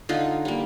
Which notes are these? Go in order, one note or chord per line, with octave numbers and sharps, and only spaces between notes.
D3 D#4 F4
G3 A#3